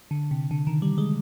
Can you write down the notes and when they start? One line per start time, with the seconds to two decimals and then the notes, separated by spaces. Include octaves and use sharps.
0.11 D3
0.31 C3
0.51 D3
0.67 D#3
0.82 G3
0.98 G#3